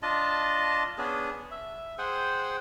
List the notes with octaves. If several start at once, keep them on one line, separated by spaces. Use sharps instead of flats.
D4 F4 D#5 A5
B3 C#4 D4 G#4
E5
G#4 C5 F#5 G5